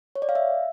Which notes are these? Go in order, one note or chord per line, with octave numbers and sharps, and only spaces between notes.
C#5
D5
F5
E5